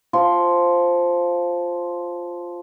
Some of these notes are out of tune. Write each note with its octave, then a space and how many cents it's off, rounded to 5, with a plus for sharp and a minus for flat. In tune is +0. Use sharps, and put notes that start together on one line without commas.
F3 +0 C#5 +5 C6 +0